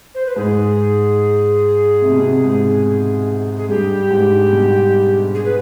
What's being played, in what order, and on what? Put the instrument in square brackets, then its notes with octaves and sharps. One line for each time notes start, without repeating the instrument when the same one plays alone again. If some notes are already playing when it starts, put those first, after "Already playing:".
[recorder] C5
B4
[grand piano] G#2 [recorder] G#4
[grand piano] C3
B2
C3
G#2
[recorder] G#4
[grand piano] G2 [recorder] G4
[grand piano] G#2
B2
[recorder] G#4
B4